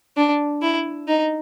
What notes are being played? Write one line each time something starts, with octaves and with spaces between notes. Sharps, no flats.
D4
E4
D#4